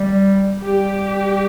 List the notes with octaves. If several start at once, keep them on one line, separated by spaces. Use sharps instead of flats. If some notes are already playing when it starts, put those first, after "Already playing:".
Already playing: G3
G3 G4